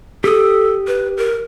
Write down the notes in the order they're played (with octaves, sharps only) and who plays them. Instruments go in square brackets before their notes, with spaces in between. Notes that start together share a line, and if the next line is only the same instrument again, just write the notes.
[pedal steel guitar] G4 D#6 [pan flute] A4
[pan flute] B4
A#4